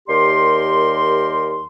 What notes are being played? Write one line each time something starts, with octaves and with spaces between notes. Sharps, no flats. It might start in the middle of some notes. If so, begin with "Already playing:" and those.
D#2 G3 G4 A#4 C6